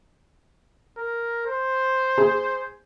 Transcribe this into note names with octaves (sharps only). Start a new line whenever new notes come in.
A#4
C5
G#4